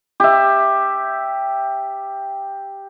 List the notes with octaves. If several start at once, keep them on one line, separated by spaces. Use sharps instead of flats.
G4 E5